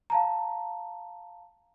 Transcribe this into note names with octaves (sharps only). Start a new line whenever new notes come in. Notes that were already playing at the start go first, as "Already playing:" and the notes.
F5 A5 A#5